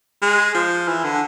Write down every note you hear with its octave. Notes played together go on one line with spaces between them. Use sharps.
G#3
F3
E3
D3